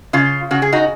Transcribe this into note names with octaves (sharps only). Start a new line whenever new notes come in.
C#3 F4
C#3 F#4
G#4
D#4 F#4